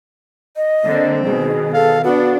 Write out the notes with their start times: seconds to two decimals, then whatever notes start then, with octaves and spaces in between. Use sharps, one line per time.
0.56 D#5
0.85 D3 A#3 C4
1.25 B2 D#3 G#4
1.74 A4 F5
2.04 B3 D4 F#4